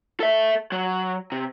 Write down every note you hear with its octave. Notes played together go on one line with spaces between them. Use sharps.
A4 E5
F#3
C3